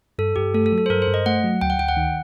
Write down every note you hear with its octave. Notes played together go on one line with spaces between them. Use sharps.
G2 A4
G2 G4
A3 A4
A4
F#3
A4
C5
G2 A#4
C5
G2
D#5
A3 F#5
F#3
D2 G5
F#5
D2 G5
F#5
D#3